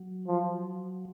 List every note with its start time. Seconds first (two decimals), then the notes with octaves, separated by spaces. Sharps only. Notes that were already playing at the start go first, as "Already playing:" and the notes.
Already playing: F#3
0.27 F3